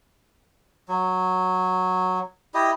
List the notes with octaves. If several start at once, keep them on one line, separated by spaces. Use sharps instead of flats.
F#3
E4 G4 D#5